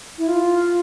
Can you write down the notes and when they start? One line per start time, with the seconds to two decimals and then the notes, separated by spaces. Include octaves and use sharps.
0.18 E4
0.28 F4